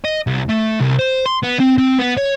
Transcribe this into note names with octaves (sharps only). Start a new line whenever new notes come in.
D#5
C2
A3
C2
C5
C6
B3
C4
C4
B3
C#5